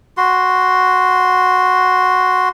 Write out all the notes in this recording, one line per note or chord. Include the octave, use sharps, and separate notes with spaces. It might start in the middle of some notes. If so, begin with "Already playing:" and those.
F#4 C6